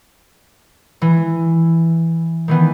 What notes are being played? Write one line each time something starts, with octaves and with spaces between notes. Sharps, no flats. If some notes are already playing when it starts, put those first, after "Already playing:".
E3
D#3 E3 B3